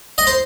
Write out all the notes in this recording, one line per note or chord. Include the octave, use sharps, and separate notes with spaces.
D#5
C5